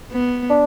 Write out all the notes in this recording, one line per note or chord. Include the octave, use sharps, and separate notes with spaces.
B3
D4